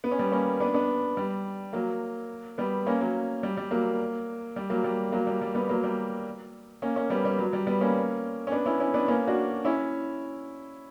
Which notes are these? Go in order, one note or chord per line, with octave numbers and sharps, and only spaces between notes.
B3
C#4
G3 B3
A#3 C#4
B3 D4
B3 D4
G3
F#3 A#3
G3 B3
A#3 C#4
F#3 A#3
G3
G3
F#3 A#3
G3
F#3 A#3
G3
F#3 A#3
G3
G3
G3 B3
F#3 A#3
G3
A#3 C#4
A#3 C#4
G3 B3
G3
F#3
G3
G3 B3
A#3 C#4
C#4
B3 D4
C#4 E4
C#4 E4
B3 D4
A#3 C#4
D4 F#4
C#4 E4